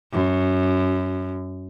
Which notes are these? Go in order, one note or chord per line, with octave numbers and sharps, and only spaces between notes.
F#2